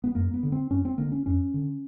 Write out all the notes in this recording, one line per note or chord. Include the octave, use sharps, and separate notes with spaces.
B3
F#2 A#3
B3
D3
C4
F#2 C#4
C4
D3 A#3
C#4
F2 C#4
D3